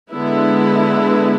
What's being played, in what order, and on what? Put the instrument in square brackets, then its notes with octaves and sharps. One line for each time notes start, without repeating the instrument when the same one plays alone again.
[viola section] D3 G#3 B3 E4